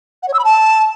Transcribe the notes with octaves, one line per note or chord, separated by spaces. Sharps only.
F#5
C#5
E6
B5
A5